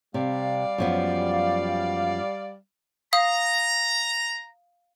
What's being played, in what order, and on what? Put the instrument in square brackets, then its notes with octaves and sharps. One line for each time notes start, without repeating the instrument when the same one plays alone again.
[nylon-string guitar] C3 [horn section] G3 D5 F5
[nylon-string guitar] F#2 F3 B3
[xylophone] F5 D#6 [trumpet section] A#5